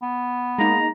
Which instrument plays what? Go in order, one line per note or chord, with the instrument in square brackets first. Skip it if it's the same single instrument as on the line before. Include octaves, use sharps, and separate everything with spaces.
[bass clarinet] B3
[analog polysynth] G#3 A#3 D#4 [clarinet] A#5